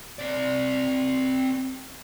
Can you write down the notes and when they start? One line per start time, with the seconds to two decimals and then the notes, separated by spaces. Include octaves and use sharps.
0.19 C4 D5